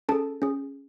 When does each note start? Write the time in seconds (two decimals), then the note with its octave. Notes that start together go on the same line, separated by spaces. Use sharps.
0.09 C#4 G#4 A4 A5
0.42 C#4 G#4